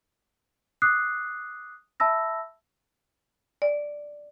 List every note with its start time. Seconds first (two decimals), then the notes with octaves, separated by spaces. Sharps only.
0.82 D6 D#6 F#6 C7
2.00 E5 A5 B5 E6 A#6
3.62 D5